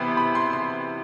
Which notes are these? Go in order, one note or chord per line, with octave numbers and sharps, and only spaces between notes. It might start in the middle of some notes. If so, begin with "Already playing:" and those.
Already playing: C3 E3 B3 B5 C6
B5
C6
C6